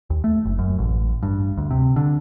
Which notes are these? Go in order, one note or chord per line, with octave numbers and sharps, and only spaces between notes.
D#2
A3
F#1
F#2
A1
G2
D2
C3
D3